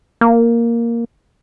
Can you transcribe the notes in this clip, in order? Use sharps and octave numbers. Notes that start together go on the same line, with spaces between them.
A#3